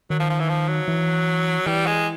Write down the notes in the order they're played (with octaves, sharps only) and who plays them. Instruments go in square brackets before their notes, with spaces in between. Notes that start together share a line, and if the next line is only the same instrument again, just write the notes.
[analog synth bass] D#3 [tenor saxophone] F#3
[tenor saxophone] F3
F3
E3
F3
F#3
[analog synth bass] E3
[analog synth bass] E3 [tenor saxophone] G3
[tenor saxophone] G#3